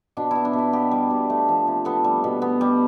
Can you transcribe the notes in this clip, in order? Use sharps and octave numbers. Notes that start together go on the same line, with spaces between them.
B2 D4
B3 E4
D4
B2 E4
B3 G4
G3
B2
A3
F3
C3
B3 A4
G3
B2
B3
G3